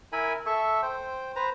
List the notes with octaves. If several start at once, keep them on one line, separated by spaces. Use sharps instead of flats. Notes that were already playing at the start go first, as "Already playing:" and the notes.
E4 A#4 G#5 B5
A4 E5 C#6
C5 G5
B4 C5 A#5